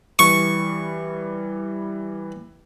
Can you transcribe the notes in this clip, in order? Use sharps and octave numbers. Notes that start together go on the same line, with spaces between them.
E3 G3 C#6